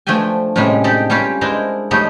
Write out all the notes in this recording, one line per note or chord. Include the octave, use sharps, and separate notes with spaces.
F3 A3 D4 E5 G5 G#5
A2 C3 G3 G#3 C#4 D4
D#4 G4 A4 D5
G3 C#4 F4 G4 C#5 D5
G#3 D4 E4 A#4 C5 F5
F3 G3 A3 D#4 G4 C#5